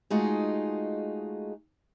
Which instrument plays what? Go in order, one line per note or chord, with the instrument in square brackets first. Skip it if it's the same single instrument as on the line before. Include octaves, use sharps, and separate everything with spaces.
[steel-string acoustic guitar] G#3 A3 D#4 F4 F#4 G#4